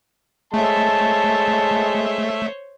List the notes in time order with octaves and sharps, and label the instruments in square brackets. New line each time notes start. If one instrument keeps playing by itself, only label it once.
[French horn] G#3 [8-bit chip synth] A3 E5 [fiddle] C5 C#5 [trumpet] A5